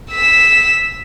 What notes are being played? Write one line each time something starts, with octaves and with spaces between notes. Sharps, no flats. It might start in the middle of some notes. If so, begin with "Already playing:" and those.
E6 B6